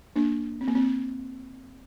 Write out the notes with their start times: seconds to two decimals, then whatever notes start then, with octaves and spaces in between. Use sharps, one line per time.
0.16 A#3 D4
0.61 C4
0.68 A#3
0.75 C4